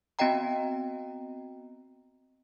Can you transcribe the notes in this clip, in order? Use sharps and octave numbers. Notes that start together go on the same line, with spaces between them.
B3 C4 F#4 D#5 G5 A#5